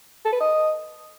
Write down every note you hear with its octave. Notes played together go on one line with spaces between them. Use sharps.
A4
B4
D#5